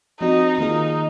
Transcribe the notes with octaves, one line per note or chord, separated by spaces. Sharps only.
F3 C4 D#4 F#4
D#3 A#3 D#4 F4 G#4